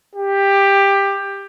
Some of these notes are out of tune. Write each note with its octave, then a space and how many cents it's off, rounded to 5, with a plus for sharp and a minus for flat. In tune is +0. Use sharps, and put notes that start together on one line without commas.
G4 +15